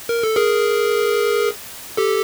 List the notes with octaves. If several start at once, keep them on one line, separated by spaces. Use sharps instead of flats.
A#4
A4
G#4 A#4
G4 A4